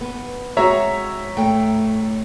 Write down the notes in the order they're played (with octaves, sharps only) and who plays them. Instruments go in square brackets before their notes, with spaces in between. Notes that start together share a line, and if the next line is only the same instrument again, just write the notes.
[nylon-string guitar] B3
[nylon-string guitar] G#3 C4 F#4 [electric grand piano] C#5 E5 A#5
[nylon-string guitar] A2 A3 G5